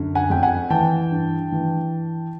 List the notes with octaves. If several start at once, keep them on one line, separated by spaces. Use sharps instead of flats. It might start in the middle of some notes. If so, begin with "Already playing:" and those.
Already playing: F#2 D3
F#5 G#5
F2 G5
F#5 G#5
E3 G5 A5
G2
E3